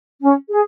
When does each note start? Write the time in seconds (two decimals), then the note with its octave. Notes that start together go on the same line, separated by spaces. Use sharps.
0.21 C#4
0.49 G#4